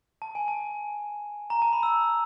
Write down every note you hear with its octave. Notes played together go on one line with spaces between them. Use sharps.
A5
G#5
A5
A#5
A5
B5
E6